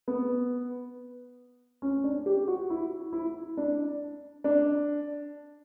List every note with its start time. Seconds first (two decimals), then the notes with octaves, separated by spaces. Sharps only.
0.08 B3
1.82 C#4
2.04 D4
2.26 G4
2.48 F#4
2.70 E4
3.13 E4
3.57 D4
4.44 D4